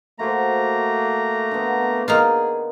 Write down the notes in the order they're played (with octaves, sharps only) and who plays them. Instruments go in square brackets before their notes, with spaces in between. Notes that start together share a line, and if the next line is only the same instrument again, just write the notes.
[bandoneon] A3 A#3 [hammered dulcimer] F#4 C5 [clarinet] A#5
[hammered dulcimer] D3 B3
[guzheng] A#3 D#4 F4 [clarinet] G#4